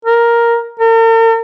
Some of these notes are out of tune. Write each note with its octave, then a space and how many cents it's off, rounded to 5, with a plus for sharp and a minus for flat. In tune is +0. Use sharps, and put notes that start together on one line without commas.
A#4 +5
A#4 -45